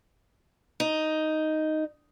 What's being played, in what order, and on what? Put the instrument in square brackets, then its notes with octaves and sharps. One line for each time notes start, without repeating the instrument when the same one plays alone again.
[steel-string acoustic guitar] D#4